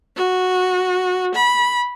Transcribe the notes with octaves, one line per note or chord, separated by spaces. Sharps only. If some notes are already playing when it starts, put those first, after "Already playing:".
F#4
B5